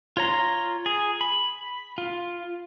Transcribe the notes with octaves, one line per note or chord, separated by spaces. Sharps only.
F4 C#5 A#5 C6
G#4
B5
F4